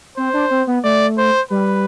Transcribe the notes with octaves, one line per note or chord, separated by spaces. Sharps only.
C4 C5
D4
C4
B3
A3 D5
C5
G3 B4